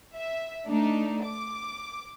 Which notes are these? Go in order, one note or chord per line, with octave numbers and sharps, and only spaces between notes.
E5
A3 D4 D#4
D6